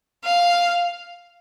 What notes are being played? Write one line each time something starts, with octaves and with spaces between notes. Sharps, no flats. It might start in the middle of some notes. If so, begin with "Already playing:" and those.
F5